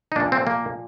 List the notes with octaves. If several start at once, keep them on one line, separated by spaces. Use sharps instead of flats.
D#4
A#2 F3 A#3 D4
C4
A#3